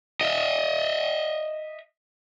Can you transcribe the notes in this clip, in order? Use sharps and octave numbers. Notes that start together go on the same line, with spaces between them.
D#5 E5